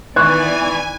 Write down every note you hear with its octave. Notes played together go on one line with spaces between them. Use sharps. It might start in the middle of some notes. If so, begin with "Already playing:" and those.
D#3 E3 B3 D5 G#5 C#6 F#6 G#6